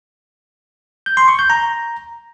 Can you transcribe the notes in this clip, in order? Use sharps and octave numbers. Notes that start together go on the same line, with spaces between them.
G6
C6
C#6
G6
A#5